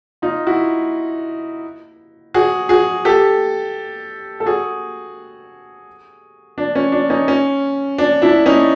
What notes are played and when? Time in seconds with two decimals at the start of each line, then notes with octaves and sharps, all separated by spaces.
0.22 D#4 F4
0.47 E4 F#4
2.34 F#4 G#4
2.69 F#4 G#4
3.05 G4 A4
4.40 A4
4.46 F#4 G#4
6.58 D4
6.75 C#4
6.92 D4
7.10 C#4 D#4
7.28 C#4
7.98 D4
8.22 D4 E4
8.46 C#4 D#4